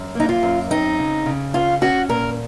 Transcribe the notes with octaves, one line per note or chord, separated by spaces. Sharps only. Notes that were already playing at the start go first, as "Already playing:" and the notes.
Already playing: F#2
A#3 D#4
F4
F#2
C4 D#4
C#3
C#3
C#4 F4
C#4 F#4
A#2 A#4